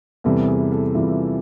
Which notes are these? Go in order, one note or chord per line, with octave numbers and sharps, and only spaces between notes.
E2 C3 E3 G3 A4
G#4
A4
E2 C3 E3 G3 F4